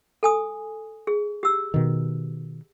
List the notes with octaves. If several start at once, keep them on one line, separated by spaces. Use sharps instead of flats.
A4 G#5 D#6
G#4
G4 E6
B2 D#3